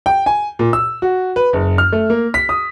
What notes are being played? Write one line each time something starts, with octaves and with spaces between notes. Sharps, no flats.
G5
G#5
A#2
E6
F#4
B4
F#1
F6
A3
A#3
B6
D#6